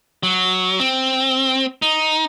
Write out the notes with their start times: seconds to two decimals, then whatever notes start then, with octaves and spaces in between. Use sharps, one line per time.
0.23 F#3
0.80 C4
1.82 D#4